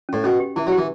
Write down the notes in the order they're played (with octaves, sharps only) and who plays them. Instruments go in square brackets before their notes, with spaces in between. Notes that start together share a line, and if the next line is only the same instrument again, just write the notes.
[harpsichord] A2 [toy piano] C#4
[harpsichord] B2 [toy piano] C#4
[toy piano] G4
[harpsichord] E3 [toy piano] E4
[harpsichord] F#3
[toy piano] G4
[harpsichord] E3